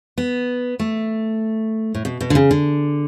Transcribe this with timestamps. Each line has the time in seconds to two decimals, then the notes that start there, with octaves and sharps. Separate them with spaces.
0.18 B3
0.79 A3
1.95 A2
2.05 B2
2.21 B2
2.30 D3
2.35 C#3
2.51 D3